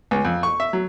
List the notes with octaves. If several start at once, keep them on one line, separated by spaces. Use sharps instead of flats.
C#2
F2
C#6
E5
F#3